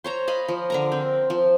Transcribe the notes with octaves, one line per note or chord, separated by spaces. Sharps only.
C5 C#5 A#5
D#5 F5 B5
F3
D3 A#4 A#5
C4
F3